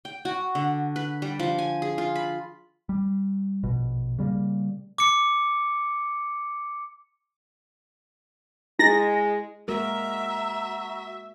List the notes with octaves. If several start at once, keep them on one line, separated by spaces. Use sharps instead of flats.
G5
F#4
D3
B4
G3
F3
G#5
G#4
F4
B5
G3
A#1 B2
C#3 G3 G#3 A#3
D6 C#7
G#3 E4 A#6
G#3 A#3 F#4 A#4 E5 A#5